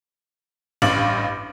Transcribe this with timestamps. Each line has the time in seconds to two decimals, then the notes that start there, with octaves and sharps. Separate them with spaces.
0.82 A1 G2 F5 D6 A6 F#7